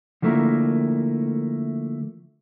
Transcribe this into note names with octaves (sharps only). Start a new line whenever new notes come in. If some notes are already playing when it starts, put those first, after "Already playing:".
D3 F3 A3 A#3 E4 A#4